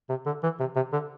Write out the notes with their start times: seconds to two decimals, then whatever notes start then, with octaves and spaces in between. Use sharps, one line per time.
0.09 C3
0.26 D3
0.43 E3
0.60 C3
0.76 C3
0.93 D3